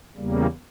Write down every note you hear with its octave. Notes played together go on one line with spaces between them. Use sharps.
E2 C#3 G3 A#3